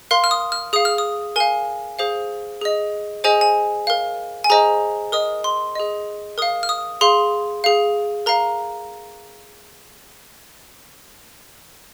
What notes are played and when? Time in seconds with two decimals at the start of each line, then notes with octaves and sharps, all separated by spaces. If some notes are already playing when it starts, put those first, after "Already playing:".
0.11 A#4 F5 C6
0.24 F6
0.31 D#6
0.52 F6
0.73 G#4 F5 D#6
0.85 F6
0.98 D#6
1.36 A#4 F5 G#5
1.99 G#4 C5 F5
2.62 G#4 D#5
3.24 G#4 C5 D#5 G#5
3.41 G#5
3.87 A#4 F5
4.44 G#5
4.50 G#4 C5 D#5 A#5
5.12 A#4 D#5 D#6
5.44 C6
5.75 G#4 D#5
6.38 A#4 F5 D#6
6.63 F6
6.69 D#6
7.01 G#4 F5 C6
7.64 G#4 F5
8.26 A#4 F5 A#5